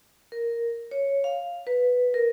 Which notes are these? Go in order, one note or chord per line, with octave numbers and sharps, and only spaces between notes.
A#4
C#5
F5
B4
A#4